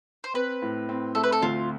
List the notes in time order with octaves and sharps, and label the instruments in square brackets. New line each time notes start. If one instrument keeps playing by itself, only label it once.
[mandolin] C5
[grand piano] C4 [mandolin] B4
[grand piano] A2
C4
[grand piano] A3 [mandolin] A4
[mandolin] B4
A4
[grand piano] D2 [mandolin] F4